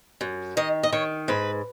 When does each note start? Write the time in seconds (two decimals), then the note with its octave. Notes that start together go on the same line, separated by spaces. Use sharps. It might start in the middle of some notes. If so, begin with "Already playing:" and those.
0.21 F#2
0.57 D#3 D#5
0.83 D#5
0.92 D#3 C#5
1.28 G#2 B4